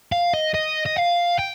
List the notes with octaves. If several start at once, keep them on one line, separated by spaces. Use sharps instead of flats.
F5
D#5
D#5
D#5
F5
G5